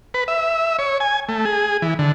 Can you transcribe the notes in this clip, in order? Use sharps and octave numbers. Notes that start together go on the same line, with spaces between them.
B4
E5
C#5
G#5
A3
G#4
E3
D3